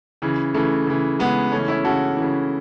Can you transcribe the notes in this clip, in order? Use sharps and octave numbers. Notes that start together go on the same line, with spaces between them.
C#3 E3
C#3 E3 A3
C#3 E3
C#3 E3 G#3 B3
C#3 E3 A3 C#4
C#4 E4
C#3 E3 F#4 A4
C#3 E3